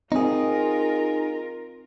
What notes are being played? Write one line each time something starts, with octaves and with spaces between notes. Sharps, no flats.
C4 D#4 F4 G#4 A#4